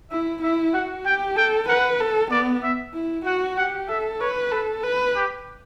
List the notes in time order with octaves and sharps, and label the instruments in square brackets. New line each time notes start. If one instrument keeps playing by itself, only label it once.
[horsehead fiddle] E4 [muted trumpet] E5
[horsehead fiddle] E4 [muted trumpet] E5
[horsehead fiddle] F#4 [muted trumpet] F#5
[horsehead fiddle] G4 [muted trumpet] G5
[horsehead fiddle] A4 [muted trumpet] G5
[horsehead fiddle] B4 [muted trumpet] F#5
[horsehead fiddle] A4
[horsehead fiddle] B3 [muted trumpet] D5
[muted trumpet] E5
[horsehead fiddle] E4
[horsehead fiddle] F#4 [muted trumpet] F#5
[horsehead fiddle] G4 [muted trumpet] F#5
[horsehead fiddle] A4 [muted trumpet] E5
[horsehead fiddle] B4 [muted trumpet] C#5
[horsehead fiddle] A4 [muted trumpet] B4
[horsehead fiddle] B4
[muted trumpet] G4